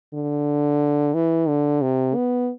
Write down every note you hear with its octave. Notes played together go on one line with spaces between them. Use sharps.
D3
E3
D3
C3
B3